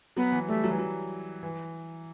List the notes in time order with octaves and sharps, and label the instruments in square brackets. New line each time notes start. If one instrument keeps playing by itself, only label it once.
[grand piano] F#3 [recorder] B3
[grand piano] E3
[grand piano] G3 [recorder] A3
[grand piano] F#3
E3
F#3
E3